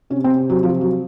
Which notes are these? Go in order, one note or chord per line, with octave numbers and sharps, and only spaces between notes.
C3 C#4
C4
F#3
F3
F#3